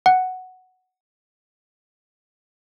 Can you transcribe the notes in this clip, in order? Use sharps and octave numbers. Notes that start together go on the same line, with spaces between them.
F#5